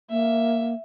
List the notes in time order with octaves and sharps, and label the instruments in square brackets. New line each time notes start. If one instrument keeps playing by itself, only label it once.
[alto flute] A#3 [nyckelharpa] E5